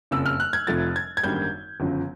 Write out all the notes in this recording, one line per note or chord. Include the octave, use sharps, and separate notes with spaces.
F#1 F2 C#3 E6
F6
F#6
G#6
F1 F2 C3 F3 A3 A6
G#6
G#6
G#1 F#2 D3 G3 A#3 G6
G1 F#2 C#3 F3